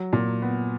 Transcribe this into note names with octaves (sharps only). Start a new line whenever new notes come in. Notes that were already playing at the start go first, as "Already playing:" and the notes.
Already playing: F#3
A#2
B3